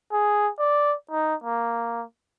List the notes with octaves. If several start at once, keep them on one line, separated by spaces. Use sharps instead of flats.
G#4
D5
D#4
A#3